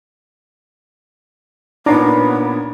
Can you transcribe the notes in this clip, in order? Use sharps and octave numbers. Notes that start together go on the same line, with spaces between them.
A#2 B3 D4 D#4 C#5 F#5 A#5 D6